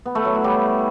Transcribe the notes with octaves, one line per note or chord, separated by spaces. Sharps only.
B3
A3
F#3
E4
G3